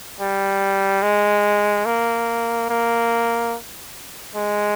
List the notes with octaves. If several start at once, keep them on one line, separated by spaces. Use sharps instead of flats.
G3
G#3
A#3
A#3
G#3